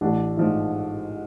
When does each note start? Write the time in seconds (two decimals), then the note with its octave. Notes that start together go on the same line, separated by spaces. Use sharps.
0.01 A1 D4
0.37 G#2 F3